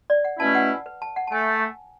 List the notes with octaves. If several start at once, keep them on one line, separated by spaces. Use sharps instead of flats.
D5
F#5
B2 A3 C#4 E4 A5
F#5
B4
A5
F#5
A5
A3 G#5